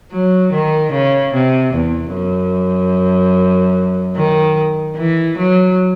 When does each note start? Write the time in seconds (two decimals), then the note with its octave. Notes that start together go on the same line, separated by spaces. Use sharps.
0.13 F#3
0.52 D#3
0.93 C#3
1.34 C3
1.74 E2
2.14 F#2
4.16 D#3
4.97 E3
5.38 F#3